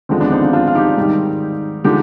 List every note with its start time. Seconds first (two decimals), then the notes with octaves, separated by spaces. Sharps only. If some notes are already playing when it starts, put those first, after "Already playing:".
0.09 D#2 D3 F3 G#3 C4
0.20 B3 D4
0.31 C4 D#4
0.42 D4 F4
0.53 D4 F4
0.68 F4
0.75 D#4 G4
0.97 G#2 D#3 G3
1.84 D3 F3 G#3 D#4 G4